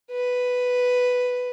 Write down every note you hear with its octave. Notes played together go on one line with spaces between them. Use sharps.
B4